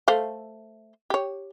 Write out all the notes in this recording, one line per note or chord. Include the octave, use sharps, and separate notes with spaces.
A3 C5 F5
G4 C#5